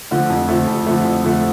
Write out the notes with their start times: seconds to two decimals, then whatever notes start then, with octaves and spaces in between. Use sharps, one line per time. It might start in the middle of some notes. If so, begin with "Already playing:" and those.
0.11 D3 F3 A3
0.30 F2
0.49 D3 F3 A3
0.67 F2
0.86 D3 F3 A3
1.05 F2
1.24 D3 F3 A3